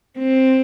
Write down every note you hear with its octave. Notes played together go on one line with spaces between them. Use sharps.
C4